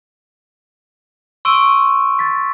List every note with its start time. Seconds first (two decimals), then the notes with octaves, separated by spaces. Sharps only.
1.45 C6 C#6 E6 D7 D#7
2.19 A6 B6